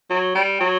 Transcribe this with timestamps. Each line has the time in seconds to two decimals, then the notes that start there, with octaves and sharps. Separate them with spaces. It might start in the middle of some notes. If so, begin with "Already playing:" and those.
0.10 F#3
0.35 G3
0.61 F#3